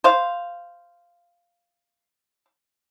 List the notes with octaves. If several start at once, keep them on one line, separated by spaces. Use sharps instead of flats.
C5 F5